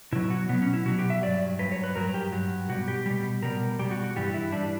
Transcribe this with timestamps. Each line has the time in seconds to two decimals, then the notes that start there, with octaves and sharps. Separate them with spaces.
0.12 B2 F#3 E4
0.30 F#4
0.49 B2 F#3 B3
0.62 C#4
0.73 E4
0.86 B2 F#3 F#4
0.99 G4
1.10 E5
1.23 G2 F#3 D5
1.59 G2 F#3 B4
1.72 C#5
1.84 B4
1.96 G2 F#3 A#4
2.14 G4
2.33 G2 F#3
2.69 B2 G3 F#4
2.88 G4
3.06 B2 G3
3.42 B2 G3 A#4
3.79 B2 G3 G4
3.91 F#4
4.04 F#4
4.16 G2 E3 G3 G4
4.34 E4
4.52 E3 G3 D4